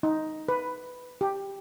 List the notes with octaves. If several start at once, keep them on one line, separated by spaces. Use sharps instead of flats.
D#4
B4
G4